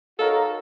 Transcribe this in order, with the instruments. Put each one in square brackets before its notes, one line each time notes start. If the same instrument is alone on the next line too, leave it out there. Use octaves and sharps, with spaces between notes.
[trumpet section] D#4 F#4 A#4 C#5 F5 [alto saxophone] A4